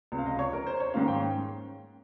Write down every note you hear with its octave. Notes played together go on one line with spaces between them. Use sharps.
C#2 C3 F3
F5
D#5
C#5
A#4
C5
C#5
G#2 D#3 G#3 C#4 F5
G5